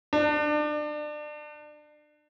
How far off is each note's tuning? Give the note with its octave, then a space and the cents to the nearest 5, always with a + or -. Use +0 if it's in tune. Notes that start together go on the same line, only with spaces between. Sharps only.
D4 +30